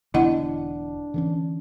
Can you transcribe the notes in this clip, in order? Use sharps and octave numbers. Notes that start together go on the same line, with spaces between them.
E1 D3 B3 D4 E4 D#5 F#5
D3 E3 C#4